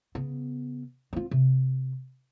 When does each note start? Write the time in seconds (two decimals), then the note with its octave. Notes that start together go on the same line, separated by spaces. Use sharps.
0.15 C#3 B3
1.13 C4 F4
1.31 C3